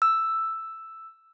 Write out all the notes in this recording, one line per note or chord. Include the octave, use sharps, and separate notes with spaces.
E6